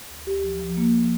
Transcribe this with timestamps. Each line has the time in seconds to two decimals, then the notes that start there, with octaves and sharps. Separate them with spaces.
0.09 D2
0.26 D2 G4
0.44 F3
0.59 F3
0.77 A#3
0.94 F3